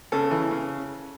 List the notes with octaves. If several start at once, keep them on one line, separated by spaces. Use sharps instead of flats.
C#3 A4
E3
C#3